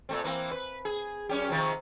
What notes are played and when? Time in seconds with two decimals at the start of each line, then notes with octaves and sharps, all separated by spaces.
0.09 A#2 A3 C4
0.24 E3 A#3 C4
0.51 B4
0.85 G#4
1.29 F#2 C#4 G4
1.49 C3 D#3 F3